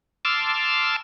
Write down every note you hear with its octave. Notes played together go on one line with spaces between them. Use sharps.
A5 C6 D6 E6 F6